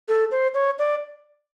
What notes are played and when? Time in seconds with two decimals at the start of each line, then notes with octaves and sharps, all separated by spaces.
0.08 A4
0.31 C5
0.54 C#5
0.79 D5